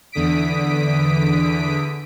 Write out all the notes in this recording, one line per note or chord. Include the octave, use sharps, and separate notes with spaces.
E2 D3 D#6 B6 D7